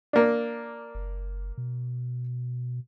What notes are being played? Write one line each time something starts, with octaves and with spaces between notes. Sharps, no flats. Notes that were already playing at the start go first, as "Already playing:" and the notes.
A#3 D4
F#1
B2